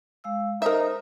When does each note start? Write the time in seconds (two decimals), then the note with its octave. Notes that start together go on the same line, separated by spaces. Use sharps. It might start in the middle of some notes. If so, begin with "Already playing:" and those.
0.24 G#3 F5 E6
0.62 D#4 A#4 C5 E5